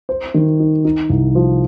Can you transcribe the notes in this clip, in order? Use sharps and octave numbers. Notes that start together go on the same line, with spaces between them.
C5
D#3
D#4
D#4
C2
F3